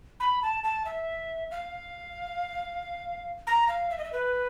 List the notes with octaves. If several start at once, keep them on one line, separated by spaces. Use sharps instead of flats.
B5
A5
A5
E5
F5
A#5
F5
E5
D#5
E5
B4